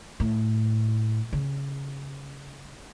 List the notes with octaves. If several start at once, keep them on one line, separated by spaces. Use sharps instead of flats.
A2
C#3